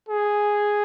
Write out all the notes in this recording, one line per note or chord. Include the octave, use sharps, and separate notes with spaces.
G#4